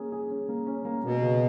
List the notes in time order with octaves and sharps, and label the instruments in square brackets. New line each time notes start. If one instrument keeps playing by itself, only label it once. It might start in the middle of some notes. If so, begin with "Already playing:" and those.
Already playing: [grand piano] A#3 C#4 G#4
G#4
C#4
A#3
C#4
A#3
[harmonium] B2 [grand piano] A#3
[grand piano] C#3